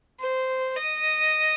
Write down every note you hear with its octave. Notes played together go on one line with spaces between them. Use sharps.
C5
D#5